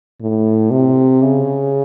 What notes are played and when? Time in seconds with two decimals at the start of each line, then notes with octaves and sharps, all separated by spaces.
0.21 A2
0.71 C3
1.22 C#3